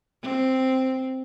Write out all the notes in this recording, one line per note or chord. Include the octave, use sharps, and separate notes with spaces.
C4